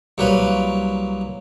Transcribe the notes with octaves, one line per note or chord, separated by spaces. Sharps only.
C2 F#3 A#3 B4